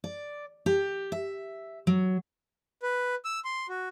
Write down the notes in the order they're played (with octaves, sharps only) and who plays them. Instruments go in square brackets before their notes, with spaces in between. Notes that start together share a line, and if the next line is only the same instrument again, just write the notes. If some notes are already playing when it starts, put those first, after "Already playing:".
[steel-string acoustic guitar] D5
G4
E5
F#3
[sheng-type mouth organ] B4
E6
C6
F#4